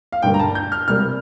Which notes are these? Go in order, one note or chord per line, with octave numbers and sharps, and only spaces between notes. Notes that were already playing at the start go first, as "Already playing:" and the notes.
F5
G2 D3 G3 A#3 G5
A#5
A5
G6
F6
C3 G3 A#3 F6